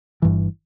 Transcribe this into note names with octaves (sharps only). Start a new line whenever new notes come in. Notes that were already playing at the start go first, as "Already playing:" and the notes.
G1 G2 E3